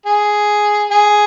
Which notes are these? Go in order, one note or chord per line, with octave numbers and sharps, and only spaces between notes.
G#4
G#4